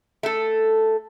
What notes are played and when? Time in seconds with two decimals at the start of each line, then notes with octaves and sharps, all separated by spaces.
0.23 A3 A4